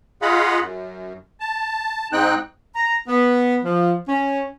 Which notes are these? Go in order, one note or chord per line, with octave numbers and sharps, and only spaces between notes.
F4 G#4 D#5 F5 F#5 B5
F#2
A5
G#2 C4 D#4 G5 F#6
A#5
B3
F3
C#4